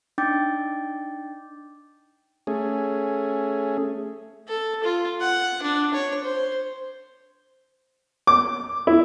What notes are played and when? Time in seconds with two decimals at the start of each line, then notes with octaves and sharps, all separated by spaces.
0.18 D4 D#4 G5 D6 G6 A6
2.47 A3 C#4 G#4
4.48 A4
4.84 F4
5.21 F#5
5.63 D4
5.94 C#5
6.23 C5
8.27 D6
8.87 E4